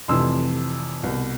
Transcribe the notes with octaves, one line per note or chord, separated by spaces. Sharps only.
F1 F2 C3 E3 C6 E6
C2 B2 B3